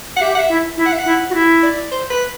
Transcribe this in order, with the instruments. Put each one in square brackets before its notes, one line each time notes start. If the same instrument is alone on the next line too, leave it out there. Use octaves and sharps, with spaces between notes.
[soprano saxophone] F#5
[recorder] G4 [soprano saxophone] E5
[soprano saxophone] F#5
E5
[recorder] E4
E4
[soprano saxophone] F#5
E5
F#5
[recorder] E4
F#4
E4
[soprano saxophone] D5
C5
B4